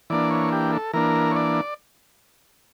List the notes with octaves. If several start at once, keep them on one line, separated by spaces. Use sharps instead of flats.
E3 A#3 D4 D5
C#5
G4
A4
E3 A#3 D4 A#4
C#5
D5